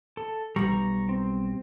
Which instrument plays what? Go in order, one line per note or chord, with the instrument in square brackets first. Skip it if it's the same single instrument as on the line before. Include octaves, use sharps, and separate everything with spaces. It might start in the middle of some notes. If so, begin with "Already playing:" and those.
[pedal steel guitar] A4
[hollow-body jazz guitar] B1 G3 [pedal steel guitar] A#5 C#6
[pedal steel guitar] C4